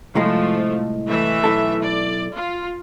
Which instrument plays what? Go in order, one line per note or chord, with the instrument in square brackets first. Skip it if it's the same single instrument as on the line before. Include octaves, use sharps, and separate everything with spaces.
[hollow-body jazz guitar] C2 A2 G#3 [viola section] F3 A3
[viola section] E3 A3 E5
[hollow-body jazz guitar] B1 E4 A4
[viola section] D5
F4